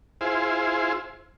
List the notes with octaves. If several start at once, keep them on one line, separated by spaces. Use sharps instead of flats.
E4 F4 G#4 C5